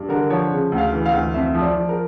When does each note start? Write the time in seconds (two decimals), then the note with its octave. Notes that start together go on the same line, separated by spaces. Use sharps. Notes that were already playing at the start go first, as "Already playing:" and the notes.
Already playing: G2
0.09 D3 A#4
0.30 F3 C#5
0.51 C#3
0.72 D2
0.78 F5
0.92 E3
1.06 F5
1.13 D2
1.34 F2 E5
1.54 F3
1.62 D5
1.76 F3
1.89 A#4